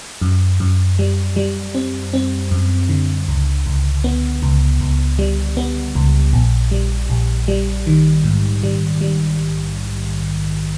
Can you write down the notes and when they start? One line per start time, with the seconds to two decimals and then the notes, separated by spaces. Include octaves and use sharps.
0.22 F#2
0.60 F#2
0.99 G3
1.36 G3
1.75 C4
2.13 C4
2.51 F#2
2.89 D3
3.28 C#2
3.66 C#2
4.04 B3
4.42 C#2
4.81 C#2
5.19 G3
5.57 B3
5.95 C#2
6.33 A#1
6.71 G3
7.10 A#1
7.48 G3
7.87 D#3
8.24 G#2
8.63 G3
9.01 G3